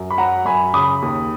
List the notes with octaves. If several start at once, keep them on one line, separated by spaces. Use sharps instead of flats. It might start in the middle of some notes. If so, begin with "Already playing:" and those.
Already playing: F#2
B5
F#3 F#5 A#5
F#2 G#5 B5
C#3 B5 D#6
D#2